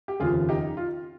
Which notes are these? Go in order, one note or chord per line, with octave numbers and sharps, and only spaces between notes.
G4
F1 D#2 C#3 F3 F4 G#4
D#4 G4
F4